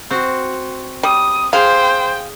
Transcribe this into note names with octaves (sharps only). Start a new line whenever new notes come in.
C4 F#4
G3 D#6
G#4 C5 F5 G5